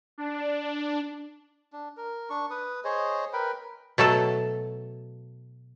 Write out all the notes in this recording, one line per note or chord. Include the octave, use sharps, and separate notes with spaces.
D4
D4
D4
A#4
D4 C#6
B4 D#6
G#4 C5 C#5 D#5
A#4 B4 G5 B5
B2 F#3 A3 A4